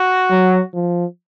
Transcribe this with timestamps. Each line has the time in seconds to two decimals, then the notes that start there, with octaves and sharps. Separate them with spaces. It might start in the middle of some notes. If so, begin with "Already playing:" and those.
Already playing: F#4
0.31 F#3
0.75 F3